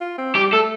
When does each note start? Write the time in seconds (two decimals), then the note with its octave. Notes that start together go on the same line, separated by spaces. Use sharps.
0.01 F4
0.18 C4
0.35 G3 G4
0.52 A3 A4